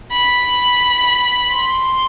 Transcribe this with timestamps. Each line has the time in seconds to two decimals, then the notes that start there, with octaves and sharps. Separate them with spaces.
0.13 B5
1.54 C6